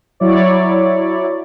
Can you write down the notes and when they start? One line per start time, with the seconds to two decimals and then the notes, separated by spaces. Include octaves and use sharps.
0.20 F#3 E4 C#5 D5